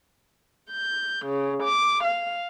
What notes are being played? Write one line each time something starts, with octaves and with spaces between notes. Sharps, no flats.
G6
C#3
D6
F5